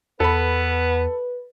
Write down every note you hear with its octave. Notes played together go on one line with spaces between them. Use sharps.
E2 B3 A4 B4 B5